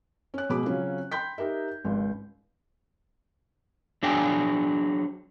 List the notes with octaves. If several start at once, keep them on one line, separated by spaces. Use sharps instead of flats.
C#4 F#6
B2 G#3 B5 D6
C#3 F#3 C4 C#4 F4
G5 B5 C6 G6 B6
D#4 G4 A#4 E5
G#1 C#2
F#3 D4 G#4 G5 G#5